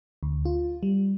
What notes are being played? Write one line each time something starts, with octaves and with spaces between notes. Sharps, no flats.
D2
F4
G3